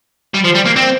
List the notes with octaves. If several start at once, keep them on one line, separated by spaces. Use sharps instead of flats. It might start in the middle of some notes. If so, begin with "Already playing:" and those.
G3
F3
G3
A#3
C4